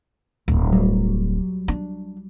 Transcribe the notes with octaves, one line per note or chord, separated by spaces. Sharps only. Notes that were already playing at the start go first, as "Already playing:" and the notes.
D1 B1
F#3 G3
D4